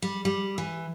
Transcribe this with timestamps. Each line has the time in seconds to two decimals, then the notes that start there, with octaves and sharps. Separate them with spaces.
0.02 G3
0.25 G3
0.58 E3